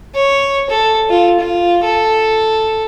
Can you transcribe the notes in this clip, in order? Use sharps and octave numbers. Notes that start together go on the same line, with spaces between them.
C#5
A4
F4
F4
A4